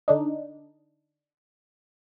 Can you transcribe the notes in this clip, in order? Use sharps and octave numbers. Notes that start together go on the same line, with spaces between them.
D3 D4 D#4